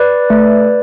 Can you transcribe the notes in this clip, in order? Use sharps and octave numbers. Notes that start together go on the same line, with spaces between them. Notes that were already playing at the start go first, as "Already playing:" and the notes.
Already playing: B4 D5
A3